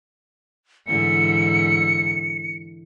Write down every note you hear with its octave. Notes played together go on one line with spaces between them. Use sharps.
G#2 D3 E3 C#7